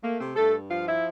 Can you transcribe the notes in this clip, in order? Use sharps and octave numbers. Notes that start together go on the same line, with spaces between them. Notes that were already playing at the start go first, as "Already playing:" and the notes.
A3 A#3
C3 C4
G2 A3 A4
F3 F4 F5
E4 E5